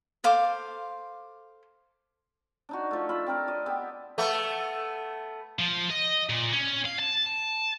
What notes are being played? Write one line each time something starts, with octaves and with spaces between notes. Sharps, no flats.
A4 C5 F5 D6
D4 D#4 F#4
F3 A3
F4 E5 B5
C4 G4 A#4
D5 D#5
B3 G4 E5
A3 B3
F3
D#5
A#2
C#4
F5
A5